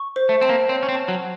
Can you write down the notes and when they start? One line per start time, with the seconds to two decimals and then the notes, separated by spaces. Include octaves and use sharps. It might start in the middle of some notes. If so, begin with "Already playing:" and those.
Already playing: C#6
0.16 C5
0.29 A3
0.41 C4 A5
0.49 A#3
0.68 C4 C#5
0.83 C#4
0.89 C4
0.95 A5
1.08 F#3